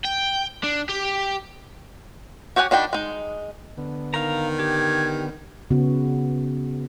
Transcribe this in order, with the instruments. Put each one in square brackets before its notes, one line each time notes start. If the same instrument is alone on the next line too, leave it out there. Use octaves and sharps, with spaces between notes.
[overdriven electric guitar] G5
D4
G4
[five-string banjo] F#4 G4 C#5 F#5 G#5
D#3 D4 F#4 G5 B5
G#3 D#4
[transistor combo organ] D3 B3
[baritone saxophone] D#3 [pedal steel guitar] F5 A#5
[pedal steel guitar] G4 [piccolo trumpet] G#6
[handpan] C#3 B3 F#4